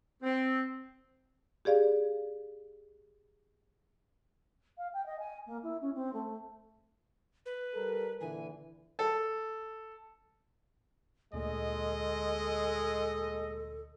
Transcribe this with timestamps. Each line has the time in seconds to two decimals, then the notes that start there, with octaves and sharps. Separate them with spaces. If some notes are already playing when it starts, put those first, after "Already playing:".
0.22 C4
1.65 G4 G#4 D5 F5
4.78 F5
4.93 G5
5.06 D#5
5.19 G#5
5.46 A#3
5.63 E4
5.81 C#4
5.95 C4
6.13 A3
7.46 B4
7.75 G3 A4 A#4
8.21 A#2 D3 E3 G#5
8.99 A4
11.33 D2 A#2 G#3 A4 D#5